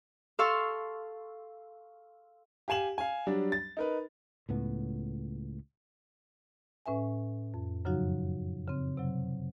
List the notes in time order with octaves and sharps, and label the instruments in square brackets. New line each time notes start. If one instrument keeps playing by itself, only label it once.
[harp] A4 F5 C6 C#6 E6
[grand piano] G4 F5 G#5 E7 F#7
F5 G#5
F#3 G3 D4
A6
D#4 A#4 B4
[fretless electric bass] C#2 A2 B3
[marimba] A2 C#4 B4 E5 G#5
F2
F#2 C#3 F3 F#3 D#4 F#4
C#3 C4
C3 F#3